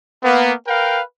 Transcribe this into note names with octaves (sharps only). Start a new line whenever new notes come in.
A#3 B3
A#4 B4 F5 G5